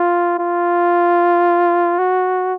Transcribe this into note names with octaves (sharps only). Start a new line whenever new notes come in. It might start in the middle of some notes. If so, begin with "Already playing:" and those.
Already playing: F4
F4
F#4